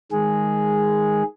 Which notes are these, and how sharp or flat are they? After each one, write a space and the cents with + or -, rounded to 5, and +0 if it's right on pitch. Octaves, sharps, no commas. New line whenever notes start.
D#3 +0 G#3 -5 G#4 +0